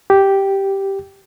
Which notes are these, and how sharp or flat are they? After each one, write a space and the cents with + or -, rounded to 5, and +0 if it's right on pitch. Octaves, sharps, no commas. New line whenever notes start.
G4 -5